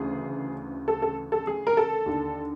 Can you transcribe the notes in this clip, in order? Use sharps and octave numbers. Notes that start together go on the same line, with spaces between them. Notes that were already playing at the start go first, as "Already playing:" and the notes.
Already playing: D2 C#3 E3 G#4
A4
A4
A4
G#4
A#4
A4
D#2 D3